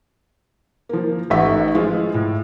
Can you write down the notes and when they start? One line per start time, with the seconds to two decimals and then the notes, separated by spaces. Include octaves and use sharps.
0.89 F3 A#3
1.30 A1 A3 D#4 E5 F#5 C#6
1.75 F3 G#3 E4 F4
2.14 A2